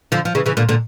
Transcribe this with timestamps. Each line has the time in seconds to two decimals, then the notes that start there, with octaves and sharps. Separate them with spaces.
0.12 D3 F3
0.25 F3
0.35 C#3 E3
0.46 C#3 E3
0.57 A#2 D3
0.69 A#2 D3